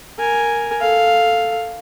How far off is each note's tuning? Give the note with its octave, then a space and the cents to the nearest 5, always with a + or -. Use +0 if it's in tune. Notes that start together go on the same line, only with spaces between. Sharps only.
A#4 +0 G#5 +0
A4 +0 F5 +0